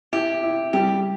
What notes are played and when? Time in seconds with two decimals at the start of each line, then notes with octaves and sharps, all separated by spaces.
0.13 E4 G4
0.43 E4
0.73 G3 G4